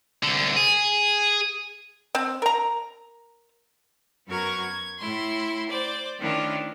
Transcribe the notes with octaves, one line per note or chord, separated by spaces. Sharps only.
C2 D3
G#4
C4
A#4 A#5
F#2 B3 F#4 A#4 C#6 G#6
G#6
A2 E4 C6
C5 D5
D#3 A3 C#4 D4 E4 F4